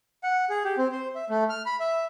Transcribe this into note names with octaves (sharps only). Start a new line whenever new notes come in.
F#5
G#4
G4
C4
C5
E5
A3
F6
B5
E5